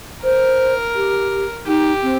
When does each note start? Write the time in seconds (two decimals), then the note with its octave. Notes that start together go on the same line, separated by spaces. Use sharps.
0.24 A#4 C5
0.95 G4
1.67 D#4 G4
2.03 C4